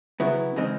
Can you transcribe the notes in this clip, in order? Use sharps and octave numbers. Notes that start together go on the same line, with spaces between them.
C#3 F#3 B3 E4
C#3 E3 G#3 C4 D#4